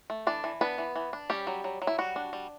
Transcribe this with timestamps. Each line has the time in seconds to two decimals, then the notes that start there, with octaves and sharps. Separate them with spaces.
0.10 A3
0.27 E3 D4 D5
0.44 E3
0.61 B3 D4 B4
0.78 E3
0.96 E3
1.13 D4
1.30 G3 C#4 G4
1.47 F#3
1.64 F#3
1.82 F#3
1.87 E4
1.98 G3 F#4
2.16 D4
2.33 G3